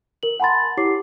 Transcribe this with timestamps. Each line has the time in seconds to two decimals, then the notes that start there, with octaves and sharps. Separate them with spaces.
0.23 A#4 F#7
0.40 F#5 G#5 A5 B5 C6 A6
0.77 E4 G4 C#5 D6 C7